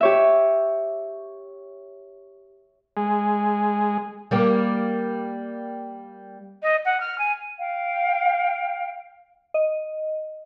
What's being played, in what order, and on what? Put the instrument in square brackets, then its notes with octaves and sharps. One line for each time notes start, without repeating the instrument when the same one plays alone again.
[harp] G4 C#5 E5
[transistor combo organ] G#3
[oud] G3 A#3 G4
[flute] D#5
F#5
F6
G#5
[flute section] F5 G5
[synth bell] D#5